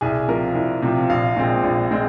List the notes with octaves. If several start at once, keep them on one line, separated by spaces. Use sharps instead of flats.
C2 G#4
C3 F3 A#4
C2
C3 F3
A#1 F5
A#2 G#3 C4
A#1
A#2 G#3 C4